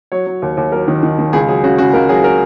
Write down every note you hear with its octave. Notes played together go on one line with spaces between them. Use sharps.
F#3 C#5
F#3
D#2
D#2
F#3 A#4
D#3
D#3
D#3
C#2 G#4
F#3 G#4
C#3 F#4
C#3 F#4
C#2 A#4
F#3 G#4
A#4